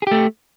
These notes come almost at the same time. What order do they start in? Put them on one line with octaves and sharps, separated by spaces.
G#4 G4 A3